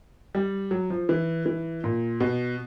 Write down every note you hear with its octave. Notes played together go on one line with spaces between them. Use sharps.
G3
F#3
F3
E3
E3
A#2
B2